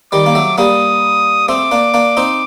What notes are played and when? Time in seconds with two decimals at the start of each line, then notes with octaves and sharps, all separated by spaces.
0.12 D#3 G3 D6
0.26 A#3
0.35 F#3 A3
0.58 G3 A#3 D#6
1.48 A3 C4 D6
1.71 A#3 D4
1.94 A#3 D4
2.17 C4 D#4